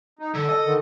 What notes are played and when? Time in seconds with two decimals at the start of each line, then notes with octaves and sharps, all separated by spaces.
0.19 D#4
0.34 D3 A4
0.49 D#5
0.62 D3 D#3